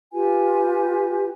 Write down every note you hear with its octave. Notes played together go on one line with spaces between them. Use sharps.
F4 G4 B4 G#5